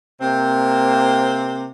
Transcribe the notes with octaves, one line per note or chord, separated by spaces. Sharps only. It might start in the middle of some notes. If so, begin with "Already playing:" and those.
C3 A#3 C4